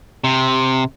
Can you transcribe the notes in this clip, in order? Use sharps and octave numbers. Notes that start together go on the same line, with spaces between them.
C3